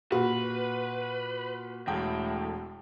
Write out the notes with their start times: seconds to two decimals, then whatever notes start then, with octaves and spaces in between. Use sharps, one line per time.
0.12 A#2 F#4 B4
1.87 E1 A2 G5